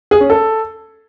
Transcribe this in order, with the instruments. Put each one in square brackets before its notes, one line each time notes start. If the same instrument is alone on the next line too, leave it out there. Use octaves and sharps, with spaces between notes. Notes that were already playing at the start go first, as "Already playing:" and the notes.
[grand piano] G#4
C#4
A4